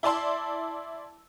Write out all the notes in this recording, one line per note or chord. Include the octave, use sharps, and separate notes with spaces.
E4 D5 A5 C6 E6